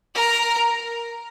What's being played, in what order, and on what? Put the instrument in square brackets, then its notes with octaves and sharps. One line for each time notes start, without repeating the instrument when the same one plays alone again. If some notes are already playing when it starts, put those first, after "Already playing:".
[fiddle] A#4